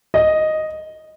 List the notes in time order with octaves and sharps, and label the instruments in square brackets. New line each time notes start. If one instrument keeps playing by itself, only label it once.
[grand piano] D#5